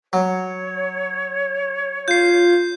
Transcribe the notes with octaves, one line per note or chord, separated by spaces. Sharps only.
F#3 C#5
F4 G6 C7